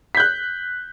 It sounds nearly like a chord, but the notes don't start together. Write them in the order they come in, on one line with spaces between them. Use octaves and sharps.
B6 G6 F#6